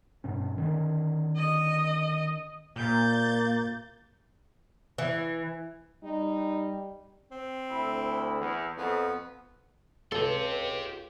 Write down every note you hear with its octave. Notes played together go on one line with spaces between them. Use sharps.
G2 B2 C#4
D3 D#3 C#4
D#5
A#2 A#3 G6 A6
E3
G3 D#4
C4
D2 E4
E2
F2 B3
C#2 G4 A4 B4 C#5 F5 C6